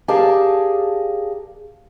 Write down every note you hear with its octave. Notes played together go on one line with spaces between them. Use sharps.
G4 G#4 A#4 D5 F5 A5